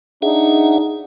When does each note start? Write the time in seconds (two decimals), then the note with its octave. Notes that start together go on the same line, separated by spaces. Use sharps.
0.22 D4 D#4 G#4 E5 F#5